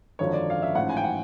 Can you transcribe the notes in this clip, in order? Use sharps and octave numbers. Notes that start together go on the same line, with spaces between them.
G#1 F#2 D3 F3 C#5
D5
F5
E5
A1 G#2 F3 F#5
G#5
G5
F#5